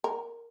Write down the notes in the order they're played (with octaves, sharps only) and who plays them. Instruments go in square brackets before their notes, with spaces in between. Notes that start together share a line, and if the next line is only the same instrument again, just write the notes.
[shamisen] A#4